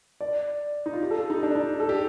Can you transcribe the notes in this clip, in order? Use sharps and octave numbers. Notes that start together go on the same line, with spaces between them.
D5
D#4
F4
G4
A4
D#4
D4
D#4
A4
G4